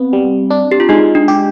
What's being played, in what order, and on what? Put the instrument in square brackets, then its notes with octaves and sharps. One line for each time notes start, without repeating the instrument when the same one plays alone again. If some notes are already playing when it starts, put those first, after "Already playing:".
Already playing: [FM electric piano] B3 [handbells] C4
[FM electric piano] G3
D4
[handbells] G4
F4
[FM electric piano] G#3 [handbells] D#4
[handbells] D4
[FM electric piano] G4